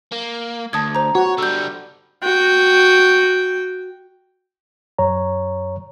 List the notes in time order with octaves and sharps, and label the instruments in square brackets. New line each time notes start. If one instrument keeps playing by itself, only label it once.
[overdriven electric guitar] A#3
[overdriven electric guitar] D2 [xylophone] A5 D#6 G#6
[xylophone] C5 A#5
[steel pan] F#4 [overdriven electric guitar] C#5
[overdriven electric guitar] D3 G3 [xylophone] E6 G6
[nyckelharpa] F#4 G5
[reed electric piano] F#2 C#5 A#5